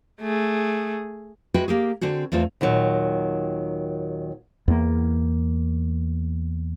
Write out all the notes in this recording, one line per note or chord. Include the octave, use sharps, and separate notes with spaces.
A3 G#4
G#3 F#4 G#4 B4 E5 G5
A#3 G4 G#4
D3 C4 F#4 G#4
E2 A3 C4 F4 G#4
D#2 A#2 D#3 F#3
E2 A#3